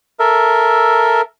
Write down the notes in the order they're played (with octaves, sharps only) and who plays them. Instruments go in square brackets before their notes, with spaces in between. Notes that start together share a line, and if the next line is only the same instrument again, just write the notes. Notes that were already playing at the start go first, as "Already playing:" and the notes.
[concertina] A4 A#4 E5